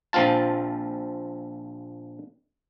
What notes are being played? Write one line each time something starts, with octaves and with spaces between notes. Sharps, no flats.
A#1 F3 C4 F4 A5